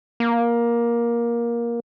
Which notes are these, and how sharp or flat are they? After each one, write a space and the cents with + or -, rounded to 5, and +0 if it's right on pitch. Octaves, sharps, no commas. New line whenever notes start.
A#3 +15